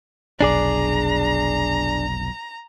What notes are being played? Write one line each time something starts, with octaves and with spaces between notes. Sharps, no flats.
F1 B1 D4 G#4 D5 A#5